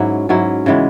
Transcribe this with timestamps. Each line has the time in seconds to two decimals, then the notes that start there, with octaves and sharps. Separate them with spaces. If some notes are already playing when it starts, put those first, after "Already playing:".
Already playing: G#2 F#3 C#4 E4
0.29 G#2 F#3 C#4 E4
0.66 C#3 E3 G#3 B3